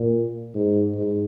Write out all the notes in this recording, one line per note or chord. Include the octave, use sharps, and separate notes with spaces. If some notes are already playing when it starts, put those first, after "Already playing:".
Already playing: A#2
G#2
G#2